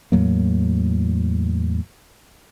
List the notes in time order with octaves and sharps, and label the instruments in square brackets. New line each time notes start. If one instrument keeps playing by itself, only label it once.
[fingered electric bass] E2 A2 F#3 A#3